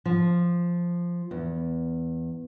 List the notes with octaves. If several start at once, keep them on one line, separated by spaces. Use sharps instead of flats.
F3
E2